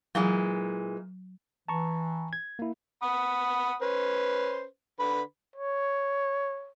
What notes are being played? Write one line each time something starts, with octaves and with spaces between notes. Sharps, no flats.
A#2 E3 F#3 G#3
E3 A5 A#5 C#6
G#6
A#3 E4
F#5 B5 D#6
C#4 B4 C5
D3 B4 B5
C#5